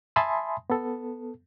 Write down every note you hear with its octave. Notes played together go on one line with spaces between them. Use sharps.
E5 G#5 A5 B5 C6 D#6
B3 A4